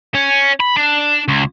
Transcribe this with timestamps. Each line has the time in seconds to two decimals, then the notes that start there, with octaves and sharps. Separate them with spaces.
0.15 C#4
0.60 B5
0.77 D4
1.28 C#2